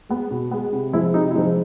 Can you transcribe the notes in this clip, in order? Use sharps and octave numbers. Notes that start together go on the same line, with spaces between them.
G#3 B3
B2
G#3 B3
C3
F3 G#3 E4
C3 D#4
E4
F3 G#3 D#4